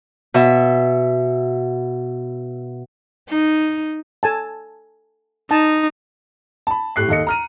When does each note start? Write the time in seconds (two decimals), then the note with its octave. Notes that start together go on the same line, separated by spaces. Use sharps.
0.34 B2 E5
3.29 D#4
4.23 A4 G#5 A5
5.51 D#4 A5
6.67 A5 B5
6.96 A2 G4 F#6 C7
7.09 D#2 A4 D#5 C#7
7.27 A#5 F6 D#7